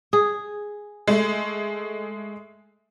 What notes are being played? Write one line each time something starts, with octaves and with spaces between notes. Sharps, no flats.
G#4
G#3 A3